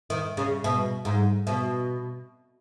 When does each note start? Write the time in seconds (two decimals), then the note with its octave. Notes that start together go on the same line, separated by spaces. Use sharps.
0.10 D#3
0.37 C#3
0.64 B2
1.05 G#2
1.47 B2